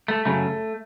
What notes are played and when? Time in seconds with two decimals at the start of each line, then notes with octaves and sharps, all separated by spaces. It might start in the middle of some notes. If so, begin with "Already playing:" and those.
0.08 A3
0.25 F#2 C#3 F#3 A3